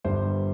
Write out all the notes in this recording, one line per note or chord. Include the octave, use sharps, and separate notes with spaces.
G1 G2 G3 C5